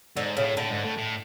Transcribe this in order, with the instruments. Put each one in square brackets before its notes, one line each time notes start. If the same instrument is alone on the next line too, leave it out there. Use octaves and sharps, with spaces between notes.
[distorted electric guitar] G#2 [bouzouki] D3
[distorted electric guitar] A2 [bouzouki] C#3
[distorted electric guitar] A2 [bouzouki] D3
[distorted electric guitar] G#2
A2
A2